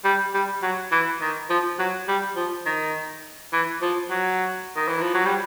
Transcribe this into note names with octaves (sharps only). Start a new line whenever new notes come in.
G3
G3
F#3
E3
D#3
F3
F#3
G3
F3
D#3
E3
F3
F#3
D#3
E3
F3
F#3
G3